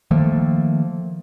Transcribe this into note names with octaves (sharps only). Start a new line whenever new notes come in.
D#3 F3 A3 A#3